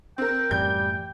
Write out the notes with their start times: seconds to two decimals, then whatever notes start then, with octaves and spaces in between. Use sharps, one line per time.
0.18 C4 A#4 G5
0.51 F#2 A2 E3 G3 G6